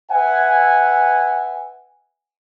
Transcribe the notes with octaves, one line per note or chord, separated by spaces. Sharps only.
B4 E5 F#5 G#5